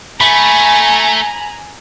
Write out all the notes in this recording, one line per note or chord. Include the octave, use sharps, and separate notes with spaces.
A3 G#5 A#5 B5